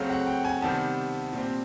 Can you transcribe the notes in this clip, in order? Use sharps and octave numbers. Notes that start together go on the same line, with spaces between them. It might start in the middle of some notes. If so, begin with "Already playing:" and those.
Already playing: C#3 F#3 A3 C4 F5
F#5
G5
G#5
C3 D#3 G3 B3 A5
A#2 G3 C4